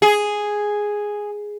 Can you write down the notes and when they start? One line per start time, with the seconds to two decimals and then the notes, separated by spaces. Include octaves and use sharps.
0.02 G#4